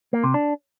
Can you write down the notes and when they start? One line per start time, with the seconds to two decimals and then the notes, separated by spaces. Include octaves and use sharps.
0.13 A#3
0.24 C3
0.34 D4